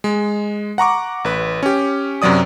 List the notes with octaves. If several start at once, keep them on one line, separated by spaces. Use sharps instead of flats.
G#3
F#5 A#5 C#6 D6
A1 B4
C#4 G4
F#2 C3 F#3 D5 D#6